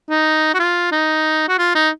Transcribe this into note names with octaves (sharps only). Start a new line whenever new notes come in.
D#4
F#4
F4
D#4
F#4
F4
D#4